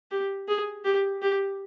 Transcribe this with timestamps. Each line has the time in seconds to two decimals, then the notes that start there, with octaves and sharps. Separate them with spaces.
0.11 G4
0.48 G#4
0.85 G4
1.22 G4